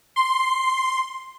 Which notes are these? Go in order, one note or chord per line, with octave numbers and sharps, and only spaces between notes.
C6